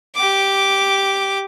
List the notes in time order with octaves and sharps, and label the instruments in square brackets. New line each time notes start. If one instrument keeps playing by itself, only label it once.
[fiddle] G4 D6